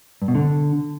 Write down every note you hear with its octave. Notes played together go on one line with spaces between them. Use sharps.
G2
B2
D3